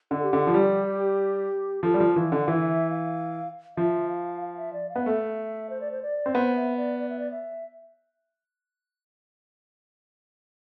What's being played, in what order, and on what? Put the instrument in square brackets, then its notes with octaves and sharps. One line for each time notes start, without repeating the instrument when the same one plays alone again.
[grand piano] D3 [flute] A4
[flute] G4
[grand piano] D3
F3
G3
[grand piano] F3 [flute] A4
[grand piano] G3
F3
[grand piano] E3 [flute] F5
[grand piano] D3
[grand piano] E3 [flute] E5
[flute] E5
F5
[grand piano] F3 [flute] E5
[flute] F5
F5
E5
D5
F5
[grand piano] B3
[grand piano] A3 [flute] E5
[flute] C5
D5
C5
D5
[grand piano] C4
[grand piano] B3 [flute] C5
[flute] E5
D5
D5
E5
D5
E5